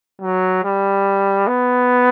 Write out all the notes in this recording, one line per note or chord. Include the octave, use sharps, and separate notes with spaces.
F#3
G3
B3